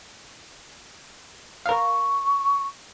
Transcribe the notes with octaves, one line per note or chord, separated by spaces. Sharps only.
A#4 F5 C#6